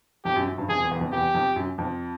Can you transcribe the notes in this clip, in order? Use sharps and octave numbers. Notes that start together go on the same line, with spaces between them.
F2 G4
F#2
F#2
G2
F2 G#4
E2
E2
F2
E2 G4
F2
F#2
F2